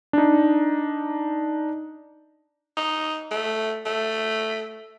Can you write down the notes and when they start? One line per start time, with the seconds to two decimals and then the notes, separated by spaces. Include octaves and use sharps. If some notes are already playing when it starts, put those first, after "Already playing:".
0.13 D4 D#4
2.77 D#4
3.31 A3
3.86 A3